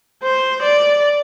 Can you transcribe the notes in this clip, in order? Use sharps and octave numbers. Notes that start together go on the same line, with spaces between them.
C5
D5